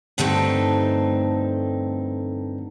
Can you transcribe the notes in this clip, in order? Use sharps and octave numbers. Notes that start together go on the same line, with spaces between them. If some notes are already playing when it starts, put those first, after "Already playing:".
G2 D3 A3 C4 D#4